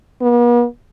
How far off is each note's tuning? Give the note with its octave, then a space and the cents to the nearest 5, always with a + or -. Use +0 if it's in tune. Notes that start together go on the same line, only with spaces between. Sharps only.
B3 -45